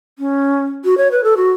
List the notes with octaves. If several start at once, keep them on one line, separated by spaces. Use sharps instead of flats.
C#4
F#4
C#5
B4
A4
F#4